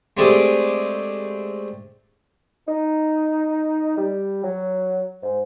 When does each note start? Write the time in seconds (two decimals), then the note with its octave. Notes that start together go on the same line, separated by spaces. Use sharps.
0.17 G#3 A3 C4 D4 G4 G#4
2.67 D#4
3.98 G3
4.43 F#3
5.22 G#2